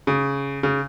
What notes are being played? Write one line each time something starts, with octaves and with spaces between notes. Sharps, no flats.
C#3
C#3